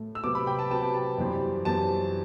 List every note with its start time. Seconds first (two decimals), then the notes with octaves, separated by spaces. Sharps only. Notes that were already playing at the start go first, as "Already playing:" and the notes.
Already playing: A2 A3
0.15 E6
0.24 C3 F#3 B3 D6
0.35 B5
0.47 G5
0.59 A5
0.70 C3 F#3 B3 A5
0.82 G5
0.94 A5
1.18 F#2 E3 G3 C4
1.65 F#2 E3 G3 C4 A5